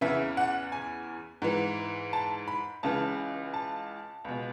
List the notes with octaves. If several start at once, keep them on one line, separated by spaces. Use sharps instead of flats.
E2 C#3 E3 E5
F#5
G#5
G#2 E3
A5
B5
C#2 C#3 E3 A5
A5
C#2 B2